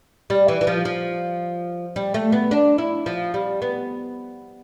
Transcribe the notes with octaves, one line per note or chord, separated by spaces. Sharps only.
G3
E3
E3
F3
F3
G3
A3
B3
D4
E4
F3
G3
B3